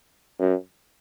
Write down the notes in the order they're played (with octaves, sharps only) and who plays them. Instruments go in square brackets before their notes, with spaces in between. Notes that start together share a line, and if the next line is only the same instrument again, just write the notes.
[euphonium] F#2